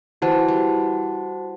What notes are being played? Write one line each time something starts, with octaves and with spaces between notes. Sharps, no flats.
E3 F#4 C5 F#5 A5
G3